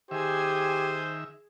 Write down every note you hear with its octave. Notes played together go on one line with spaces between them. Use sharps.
D#3 G4 G#4 C5 E5 G#5